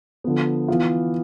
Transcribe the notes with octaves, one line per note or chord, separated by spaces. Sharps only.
D3 F3 B3
E3 B3 F4